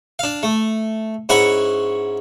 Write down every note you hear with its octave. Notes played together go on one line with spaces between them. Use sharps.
D4 F5
A3
G#2 C#4 E4 F#5 B5 C#6